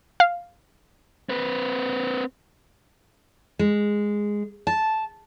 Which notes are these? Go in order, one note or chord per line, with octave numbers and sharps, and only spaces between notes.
F5
C4 B4
G#3
A5